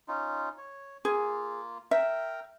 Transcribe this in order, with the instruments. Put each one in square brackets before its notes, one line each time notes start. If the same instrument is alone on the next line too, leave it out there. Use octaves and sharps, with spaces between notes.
[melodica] C#4 D#4 F4
C#5
[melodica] A#3 F4 [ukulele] G#4
[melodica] A#4 G5 A#5 [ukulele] E5